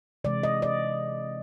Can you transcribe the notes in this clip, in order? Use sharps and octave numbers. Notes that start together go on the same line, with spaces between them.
C3 E3 G#3 D5
D#5
D5